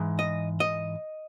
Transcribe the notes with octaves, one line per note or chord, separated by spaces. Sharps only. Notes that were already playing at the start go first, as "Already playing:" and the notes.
Already playing: G#2 E3 G#3
D#5
D#5